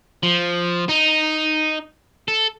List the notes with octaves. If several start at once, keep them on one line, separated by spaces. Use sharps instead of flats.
F3
D#4
A4